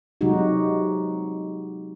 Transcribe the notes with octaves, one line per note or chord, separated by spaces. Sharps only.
C3 F#3 G#3 D#4 F#4 G4